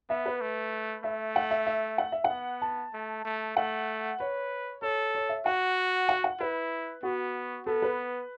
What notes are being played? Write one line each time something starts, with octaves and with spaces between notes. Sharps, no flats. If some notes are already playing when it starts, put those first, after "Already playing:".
B3 E5
B4
A3
A3 E5
F#5
E5
E5
F#5
E5
F#5
B3
A5
A3
A3
A3 F#5
B4 C#5
A4 C#5
C#5
E5
F#4 F#5
F#5
F#5
E4 B4
B3 F#4
B3 A4
B4